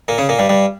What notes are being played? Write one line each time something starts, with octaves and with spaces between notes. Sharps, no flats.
A#2 A#3
C#3 C#4
A#2 A#3
G2 G3
G2 G3